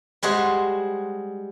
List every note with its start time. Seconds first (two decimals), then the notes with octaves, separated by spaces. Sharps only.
0.23 G3 G#3 F#4 G#4 C5